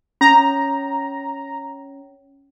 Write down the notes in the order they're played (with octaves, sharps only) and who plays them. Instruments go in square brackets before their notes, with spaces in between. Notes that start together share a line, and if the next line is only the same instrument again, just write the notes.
[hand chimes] C#4 [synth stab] A#5